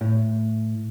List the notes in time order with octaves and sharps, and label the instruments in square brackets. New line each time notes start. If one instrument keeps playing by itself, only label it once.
[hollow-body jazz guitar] A2